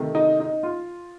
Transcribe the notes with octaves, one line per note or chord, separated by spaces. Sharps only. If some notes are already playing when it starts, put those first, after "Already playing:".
Already playing: C3 D#3 A3
D#4
D#4
F4